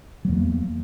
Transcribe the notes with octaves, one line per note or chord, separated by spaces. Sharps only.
E2 F#3 A#3